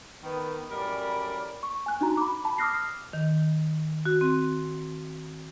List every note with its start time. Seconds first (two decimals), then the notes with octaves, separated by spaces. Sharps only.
0.23 D#3 B3
0.70 F#2 A2 G3 A#4 D5 B5
1.63 C#6
1.86 G#5 F#6
2.01 D4 D#4 F#4 A#5
2.17 B5 D6
2.44 A5 B5
2.58 D6 D#6 F6 F#6 A#6 C7
3.13 D#3
4.05 F#4
4.21 C4